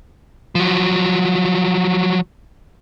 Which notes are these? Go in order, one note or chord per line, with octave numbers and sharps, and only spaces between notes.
F3 F#3